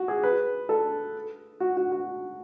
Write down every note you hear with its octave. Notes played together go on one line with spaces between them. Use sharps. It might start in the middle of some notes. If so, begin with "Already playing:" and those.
Already playing: F#4
G#4
B4
A4
F#4
F#4
F#4